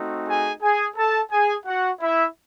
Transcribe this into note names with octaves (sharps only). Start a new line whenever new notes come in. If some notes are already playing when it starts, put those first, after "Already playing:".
Already playing: A3 C4 D#4 F#4
G#4 G#5
G#4 G#5
A4 A5
G#4 G#5
F#4 F#5
E4 E5